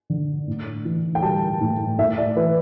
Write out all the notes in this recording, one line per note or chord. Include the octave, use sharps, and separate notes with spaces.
D3
A2
E3
G5
G3 A5
A2
A2 E5
D5
E3 B4